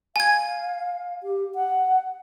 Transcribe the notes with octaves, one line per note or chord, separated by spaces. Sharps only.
F5 G#5 G#6
G4
F#5